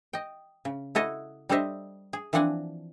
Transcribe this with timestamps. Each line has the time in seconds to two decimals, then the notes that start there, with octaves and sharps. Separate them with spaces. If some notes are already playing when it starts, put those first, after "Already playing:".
0.13 D#5 G5
0.65 C#3
0.95 E4 F#4 A4 D#5
1.49 G3 D4 A4 C5 D#5 E5
2.13 G#4
2.33 E3 F3 C4 D4 F#5 G#5